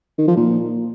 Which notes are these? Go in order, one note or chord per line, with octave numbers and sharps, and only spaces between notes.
D#3
F3
A#2